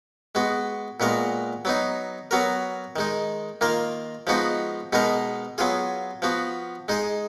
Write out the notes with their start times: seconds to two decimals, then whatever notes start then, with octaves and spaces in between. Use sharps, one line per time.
0.35 G#3 B3 F#4
1.00 A#2 G#3 B3 F#4 A#4
1.65 F#3 B3 D#4
2.31 F#3 B3 F#4 A#4
2.96 D#3 G#3 D#4
3.61 D#3 A#3 F4 A#4
4.27 F3 G#3 B3 D#4 F#4
4.93 B2 G#3 B3 D#4 A#4
5.58 F#3 B3 F4 G#4
6.22 F3 B3 F#4
6.88 G#3 D#4 G#4